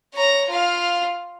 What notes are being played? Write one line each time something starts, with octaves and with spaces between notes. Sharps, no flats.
C#5 A#5
F4 F5